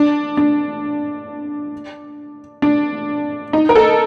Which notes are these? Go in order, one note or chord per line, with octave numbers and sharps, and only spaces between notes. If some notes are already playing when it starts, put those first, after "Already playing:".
Already playing: D4
D4
D4
D#4
A#4
A4